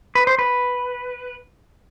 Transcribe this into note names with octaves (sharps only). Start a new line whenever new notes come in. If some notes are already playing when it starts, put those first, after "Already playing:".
B4
C5
B4